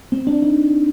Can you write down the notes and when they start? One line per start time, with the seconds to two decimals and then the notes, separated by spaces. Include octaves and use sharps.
0.12 C4
0.27 D4
0.42 D#4